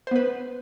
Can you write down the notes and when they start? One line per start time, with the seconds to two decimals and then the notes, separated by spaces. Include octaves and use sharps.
0.07 C5
0.11 B3
0.16 B4